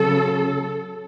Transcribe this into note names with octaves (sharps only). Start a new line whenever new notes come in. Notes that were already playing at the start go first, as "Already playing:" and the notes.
Already playing: C#3 F#3 A4